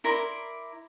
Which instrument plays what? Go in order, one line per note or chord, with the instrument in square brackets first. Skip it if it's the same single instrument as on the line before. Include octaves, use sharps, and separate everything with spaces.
[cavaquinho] E4 A#4 D5 C6